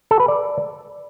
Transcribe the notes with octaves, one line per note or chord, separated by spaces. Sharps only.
A4
B4
D5